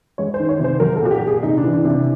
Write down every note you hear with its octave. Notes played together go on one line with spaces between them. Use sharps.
G#3 C#5
C5
D#3
C#5
C3 C5
F#3 A#4
A4
A#2 F#4
G4
A#2
G#4
C3 D#4
E3 D4
D4
C3
D4